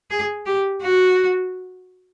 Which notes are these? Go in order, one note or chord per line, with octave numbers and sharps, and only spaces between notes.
G#4
G4
F#4